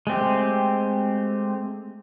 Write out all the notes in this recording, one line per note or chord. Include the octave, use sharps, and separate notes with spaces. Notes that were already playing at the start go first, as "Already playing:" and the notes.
G#3 A3 C4 G4